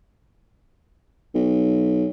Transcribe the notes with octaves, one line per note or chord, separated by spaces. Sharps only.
B1